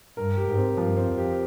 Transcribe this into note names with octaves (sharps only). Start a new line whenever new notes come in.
G2 A#4
G4
G#2
C4
G2 F3
C4
F2
G4